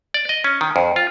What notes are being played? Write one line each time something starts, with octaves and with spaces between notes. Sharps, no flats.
D5
D#5
C#4
D#3
F2
F4